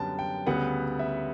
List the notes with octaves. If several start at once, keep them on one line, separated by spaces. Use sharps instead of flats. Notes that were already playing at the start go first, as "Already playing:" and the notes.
Already playing: F#2 D3 G3 B3 G5 A5
G5
D2 C#3 G3 B3 F#5
E5